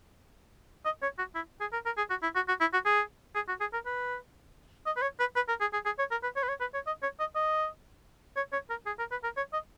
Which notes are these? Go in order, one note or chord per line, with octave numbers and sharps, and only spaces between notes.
D#5
C#5
F#4
E4
G#4
A#4
A#4
G#4
F#4
E4
F#4
F#4
E4
F#4
G#4
G#4
F#4
G#4
A#4
B4
D#5
B4
C#5
B4
B4
A#4
G#4
G#4
G#4
C#5
A#4
B4
C#5
B4
C#5
B4
C#5
D#5
C#5
D#5
D#5
C#5
C#5
A#4
G#4
A#4
B4
A#4
C#5
D#5